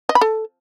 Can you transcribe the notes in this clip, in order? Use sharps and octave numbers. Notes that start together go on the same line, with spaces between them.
D#5
B5
A4